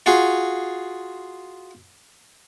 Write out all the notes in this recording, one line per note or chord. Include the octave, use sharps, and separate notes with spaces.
F4 F#4 G#4